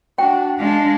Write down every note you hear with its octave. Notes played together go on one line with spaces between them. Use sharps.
D4 F#4 G5
G#3 D4 F5 A5